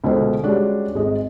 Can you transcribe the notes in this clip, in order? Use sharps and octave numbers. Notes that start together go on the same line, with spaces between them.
C#2 B2 D3 A3 C5
G3 G#3 C#4 D4 F#4
G#1 G#3 D#5